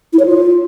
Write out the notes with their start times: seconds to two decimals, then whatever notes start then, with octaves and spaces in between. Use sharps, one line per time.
0.13 E4
0.19 C#5
0.26 F4